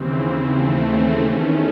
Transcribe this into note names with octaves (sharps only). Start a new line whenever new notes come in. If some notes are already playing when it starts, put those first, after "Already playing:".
Already playing: D#2 C#3 E3 C4
A3
C4
E2 D#3 A3 C#4